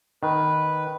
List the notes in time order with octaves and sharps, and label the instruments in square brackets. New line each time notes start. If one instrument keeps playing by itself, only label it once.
[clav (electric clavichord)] D#3 [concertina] B4